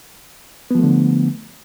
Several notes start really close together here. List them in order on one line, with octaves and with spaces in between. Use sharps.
B3 F3 A3 D3